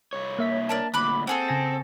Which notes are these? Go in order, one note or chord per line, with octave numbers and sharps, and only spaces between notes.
C2 C#5
A#3 E5 B6
D4 A#4 A5
D2 A#2 B5 D6 F#6
C4 F#4 G#4 A4
C#3 G#5 A#6